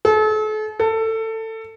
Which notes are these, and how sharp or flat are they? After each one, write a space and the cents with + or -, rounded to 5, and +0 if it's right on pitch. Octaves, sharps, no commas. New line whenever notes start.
A4 -40
A4 +20